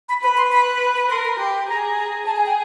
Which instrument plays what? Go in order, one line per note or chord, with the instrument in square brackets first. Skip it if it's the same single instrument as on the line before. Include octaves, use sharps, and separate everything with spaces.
[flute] B5
[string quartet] B4 [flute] B5
[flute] C6
B5
B5
B5
[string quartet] A#4 [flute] C6
[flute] B5
[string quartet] G4 [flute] C6
[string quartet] G#4 [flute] A#5
[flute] A#5
[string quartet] G#4 [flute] A5
[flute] G#5
G5